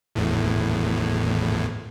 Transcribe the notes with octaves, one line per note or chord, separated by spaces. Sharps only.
G#1 E2 A2